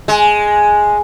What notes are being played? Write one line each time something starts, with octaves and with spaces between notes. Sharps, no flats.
G#3